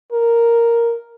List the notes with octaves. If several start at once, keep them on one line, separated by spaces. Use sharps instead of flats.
A#4